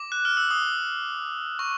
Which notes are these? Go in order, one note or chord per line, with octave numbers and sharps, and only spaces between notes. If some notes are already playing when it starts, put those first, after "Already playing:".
Already playing: D6
F#6
F6
E6
D#6
C#6